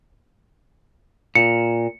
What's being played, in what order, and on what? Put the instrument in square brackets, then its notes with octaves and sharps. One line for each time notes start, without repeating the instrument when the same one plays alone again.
[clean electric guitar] A#2 [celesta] C#7